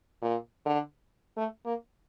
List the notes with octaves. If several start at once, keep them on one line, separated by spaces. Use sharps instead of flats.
A#2
D3
A3
A#3